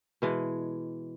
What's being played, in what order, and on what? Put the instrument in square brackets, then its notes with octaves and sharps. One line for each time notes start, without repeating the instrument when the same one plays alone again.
[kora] B2 E3 G#3